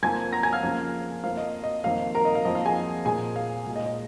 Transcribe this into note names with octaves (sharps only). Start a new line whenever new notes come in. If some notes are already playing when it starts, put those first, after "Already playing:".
F2 F3 A#3 G#5 G#6
A#5 A#6
G#5 G#6
F5 F6
F2 C#3 F3 A#3
F2 F3 A#3 F5
D#5
D#5
F2 D#3 A#3 F5
A#4 A#5
D#5
F5
F2 F3 A#3 D#5
F5
G#4 G#5
A#2 A#3 G#4 G#5
F5
A#2 G#3
D#5
D#5